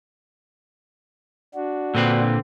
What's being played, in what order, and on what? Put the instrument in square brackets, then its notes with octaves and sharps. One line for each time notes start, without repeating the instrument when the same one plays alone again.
[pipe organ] D4 F#4
[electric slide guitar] A#2 [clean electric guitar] D3 C4 B4